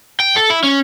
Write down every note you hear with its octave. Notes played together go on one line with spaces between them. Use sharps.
G5
A4
E4
C#4